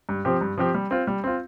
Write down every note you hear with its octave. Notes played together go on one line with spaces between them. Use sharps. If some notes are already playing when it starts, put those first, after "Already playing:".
G2
F3 C4 G4
G2
F3 C4 G4
G3
C4 F4
G3
C4 F4